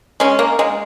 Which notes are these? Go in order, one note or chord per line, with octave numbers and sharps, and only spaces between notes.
G#3 C#4
A#3
G#3